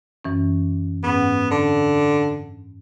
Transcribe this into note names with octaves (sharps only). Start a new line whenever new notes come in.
F#2 E3 C#4
G#2 B3 C#4 F#5
D3